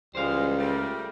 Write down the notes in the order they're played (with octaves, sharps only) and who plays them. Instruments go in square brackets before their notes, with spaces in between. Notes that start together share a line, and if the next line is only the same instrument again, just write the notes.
[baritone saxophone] C#2 [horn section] E3 G3 G#3 [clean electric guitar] C5 F5
[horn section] G3 A3 A#4